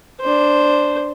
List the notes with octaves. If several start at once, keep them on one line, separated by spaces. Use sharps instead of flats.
D4 C5